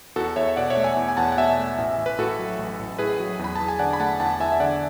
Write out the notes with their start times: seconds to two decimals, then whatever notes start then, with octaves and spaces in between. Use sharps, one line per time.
0.16 E2 F#4 A4
0.36 E2 C#5 E5
0.56 B2 D5 F#5
0.70 C#5 E5
0.77 A3
0.84 E5 G#5
0.97 E2
1.08 G#5
1.17 E2 F#5 A5
1.32 F#5
1.37 B2 E5 G#5
1.58 A3
1.78 A1
1.98 A1
2.06 B4
2.18 A2 F#4 A4
2.39 F#3
2.59 A1
2.79 A1
2.98 A2 G#4 B4
3.20 F#3
3.39 E2
3.44 B5
3.56 E2 A5
3.68 G#5
3.79 D3 D5 F#5
3.93 B5
4.00 A3 F#5 A5
4.20 E2 F#5 A5
4.40 E2 E5 G#5
4.52 E5
4.60 D3 D5 F#5